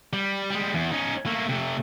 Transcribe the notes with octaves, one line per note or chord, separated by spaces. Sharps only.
G3
G3 G#3
E2
C#4 D#4
A3 A#3
C3 A3